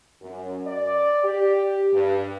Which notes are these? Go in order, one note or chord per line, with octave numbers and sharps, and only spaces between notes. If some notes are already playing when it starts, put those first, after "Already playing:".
F#2
D5
G4
G2